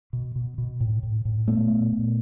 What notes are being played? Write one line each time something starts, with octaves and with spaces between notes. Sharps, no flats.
B2
B2
B2
A2
A2
A2
A#2 A3 B3
A#2
A#2